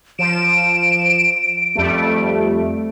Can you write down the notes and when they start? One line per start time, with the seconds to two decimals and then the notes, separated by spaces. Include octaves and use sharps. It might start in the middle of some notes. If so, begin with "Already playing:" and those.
0.19 F3 D7 E7
1.76 F2 G3 A3